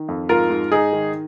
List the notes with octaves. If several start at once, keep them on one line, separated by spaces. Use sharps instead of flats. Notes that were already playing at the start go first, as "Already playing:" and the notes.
Already playing: D#3
F2
G#2 F4 A#4
G#2
G#2 D#4 G#4
D#3